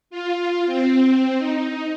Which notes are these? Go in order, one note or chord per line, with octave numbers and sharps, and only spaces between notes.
F4
C4
D#4